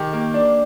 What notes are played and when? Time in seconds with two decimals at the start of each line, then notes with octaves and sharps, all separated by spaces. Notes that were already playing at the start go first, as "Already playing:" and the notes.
Already playing: D#3 G4
0.13 A#3
0.34 D4